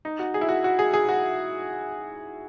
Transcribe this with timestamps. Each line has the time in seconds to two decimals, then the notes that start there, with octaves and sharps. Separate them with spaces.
0.05 D#4
0.19 F#4
0.34 G#4
0.41 E4
0.49 F#4
0.64 F#4
0.79 G#4
0.94 G#4
1.09 F#4